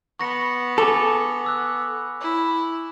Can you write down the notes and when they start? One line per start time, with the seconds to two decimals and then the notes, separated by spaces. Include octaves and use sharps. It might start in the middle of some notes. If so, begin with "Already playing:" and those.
0.20 B3 C#6 A#6 C#7
0.78 A4 G#5 D6 F7
1.44 D6 E6 F#6
2.21 E4